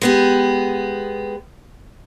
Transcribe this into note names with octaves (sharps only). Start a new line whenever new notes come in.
G#3 B3 G4